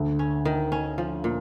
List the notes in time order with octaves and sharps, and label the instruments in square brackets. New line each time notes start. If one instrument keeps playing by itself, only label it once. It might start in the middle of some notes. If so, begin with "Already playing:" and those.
Already playing: [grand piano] D2 D3
[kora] C#4
D#3
C#4
F3
A#2